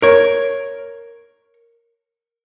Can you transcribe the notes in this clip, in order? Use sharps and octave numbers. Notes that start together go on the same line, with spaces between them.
A#4 C#5